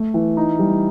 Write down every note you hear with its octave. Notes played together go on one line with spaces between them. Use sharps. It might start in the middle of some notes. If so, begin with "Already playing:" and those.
Already playing: A3
E3
D#4
G3